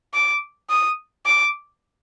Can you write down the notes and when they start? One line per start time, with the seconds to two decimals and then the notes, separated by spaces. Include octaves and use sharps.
0.14 D6
0.70 D#6
1.26 D6